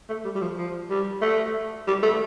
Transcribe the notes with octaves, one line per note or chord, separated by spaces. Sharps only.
A3
G3
G3
F3
F3
G3
A3
G3
A3